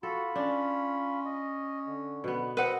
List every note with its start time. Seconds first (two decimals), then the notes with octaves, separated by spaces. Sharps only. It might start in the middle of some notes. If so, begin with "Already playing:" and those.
0.03 F4 F#4 A4 B5
0.36 C#4 D4
1.26 D#5
1.87 D3
2.24 B2 B3
2.57 C4 B4 D#5 F#5